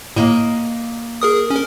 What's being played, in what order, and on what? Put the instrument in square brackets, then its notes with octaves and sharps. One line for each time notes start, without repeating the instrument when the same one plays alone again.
[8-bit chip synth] A2 [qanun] A#3 D#5
[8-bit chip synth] G#4 A#4 D#6
C#4 A#4